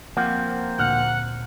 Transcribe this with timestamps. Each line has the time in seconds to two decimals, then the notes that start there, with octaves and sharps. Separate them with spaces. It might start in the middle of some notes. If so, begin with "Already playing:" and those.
0.17 F3 A#3 C4 F#5
0.79 D2 A#2 F#5 F6